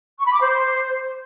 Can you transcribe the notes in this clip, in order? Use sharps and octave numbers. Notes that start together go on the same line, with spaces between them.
C#6
B5
D6
C5